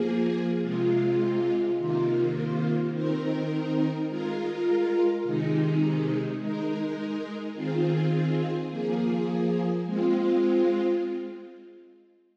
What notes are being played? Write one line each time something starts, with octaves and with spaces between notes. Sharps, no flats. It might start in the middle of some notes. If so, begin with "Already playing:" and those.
Already playing: F3 A#3 G#4
C3 G#3 F4
C3 D#3 A#3 F4
D#3 C4 D#4 A#4
G#3 F4 A#4
C3 D#3 G#3 D#4
G#3 D#4 A#4
D#3 C4 F4 G#4
F3 A#3 G#4
G#3 C4 F4